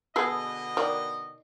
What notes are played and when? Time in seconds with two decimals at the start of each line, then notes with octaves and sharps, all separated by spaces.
0.16 B2 D3 B3 G#4 A4 D#5
0.77 D#3 D5